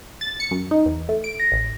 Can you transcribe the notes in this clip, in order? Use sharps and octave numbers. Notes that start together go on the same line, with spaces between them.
A6
C#7
F#2
D#4
E2
A3
D7
A#6
A1